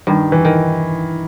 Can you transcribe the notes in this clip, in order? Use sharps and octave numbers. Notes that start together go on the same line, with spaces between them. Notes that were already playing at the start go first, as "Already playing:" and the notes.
G2 D#3
E3
D#3